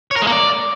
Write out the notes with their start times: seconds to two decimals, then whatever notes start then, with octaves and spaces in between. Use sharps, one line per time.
0.11 C#5
0.16 A#4
0.22 G#3
0.27 A#3
0.32 D5